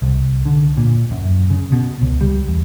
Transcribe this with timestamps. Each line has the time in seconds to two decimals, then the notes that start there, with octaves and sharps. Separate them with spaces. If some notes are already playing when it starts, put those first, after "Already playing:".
0.02 C2
0.45 D3
0.77 A#2
1.11 F#2
1.50 C#3
1.72 B2
2.02 C#2
2.21 G3
2.48 E2